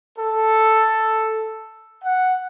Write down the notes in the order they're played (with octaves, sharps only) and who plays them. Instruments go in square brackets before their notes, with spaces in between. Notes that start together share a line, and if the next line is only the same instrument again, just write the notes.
[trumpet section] A4
F#5